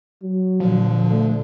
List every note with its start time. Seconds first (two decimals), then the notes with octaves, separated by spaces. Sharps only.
0.23 F#3
0.60 A#2 D3 F3
1.10 A3